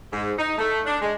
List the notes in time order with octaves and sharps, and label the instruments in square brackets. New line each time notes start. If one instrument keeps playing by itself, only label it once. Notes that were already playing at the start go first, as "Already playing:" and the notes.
[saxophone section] G#2
D#4
A3
D4
G#3